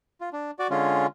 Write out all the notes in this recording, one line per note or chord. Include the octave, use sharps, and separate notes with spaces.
F4
D4
F#4 D5
D3 G#3 C#4 F4